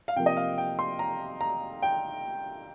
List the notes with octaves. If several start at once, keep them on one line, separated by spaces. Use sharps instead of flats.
F5
C3 F3 A#3 G5
D#5
F5
G5
C6
A#5
A#5
G5